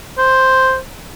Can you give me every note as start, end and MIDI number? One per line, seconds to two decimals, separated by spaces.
0.18 0.77 72